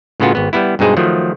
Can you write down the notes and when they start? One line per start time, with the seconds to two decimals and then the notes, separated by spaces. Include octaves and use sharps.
0.20 A2 C#3 B3 C#4 F4 F#4
0.35 G#1 B3
0.53 G3 B3 E4
0.79 G2 B2 G#3 D#4 G#4 C5
0.97 D#3 F3 F#3 A3